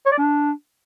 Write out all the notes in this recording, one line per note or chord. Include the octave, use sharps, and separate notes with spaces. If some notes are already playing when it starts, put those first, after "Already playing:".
C#5
D5
D4